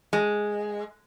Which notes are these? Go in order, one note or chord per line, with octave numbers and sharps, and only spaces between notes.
G#3